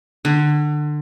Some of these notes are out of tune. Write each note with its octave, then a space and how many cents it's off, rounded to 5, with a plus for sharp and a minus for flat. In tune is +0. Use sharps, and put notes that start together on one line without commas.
D3 +25